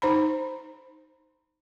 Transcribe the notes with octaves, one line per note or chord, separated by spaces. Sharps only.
D#4 C5 A#5 B5